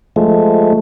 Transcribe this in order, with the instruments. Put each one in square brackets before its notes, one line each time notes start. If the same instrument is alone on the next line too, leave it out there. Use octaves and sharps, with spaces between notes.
[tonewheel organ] F3 G#3 A3